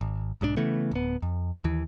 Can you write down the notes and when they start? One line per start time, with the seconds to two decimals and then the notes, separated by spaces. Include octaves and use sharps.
0.01 G#1
0.41 B1 G#2 F3 D4
0.57 C#3 E3 A3 B3
0.91 D1 B3
1.22 F2
1.64 D#2 E3